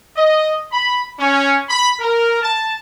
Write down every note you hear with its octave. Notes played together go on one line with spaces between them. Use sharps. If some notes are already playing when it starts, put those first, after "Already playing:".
D#5
B5
C#4
B5
A#4
A5